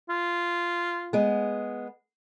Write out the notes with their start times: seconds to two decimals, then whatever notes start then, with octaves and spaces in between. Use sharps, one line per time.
0.09 F4
1.13 G#3 B3